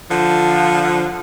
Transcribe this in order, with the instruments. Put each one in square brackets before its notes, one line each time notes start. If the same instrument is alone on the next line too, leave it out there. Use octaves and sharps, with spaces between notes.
[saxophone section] D3 F3